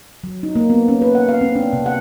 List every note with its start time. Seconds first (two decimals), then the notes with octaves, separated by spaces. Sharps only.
0.24 F#3
0.43 D#4
0.55 A#3
0.70 B3
0.88 C#4
1.02 B4
1.15 F#5
1.29 F5
1.41 C4
1.56 D4
1.73 C3
1.86 F#5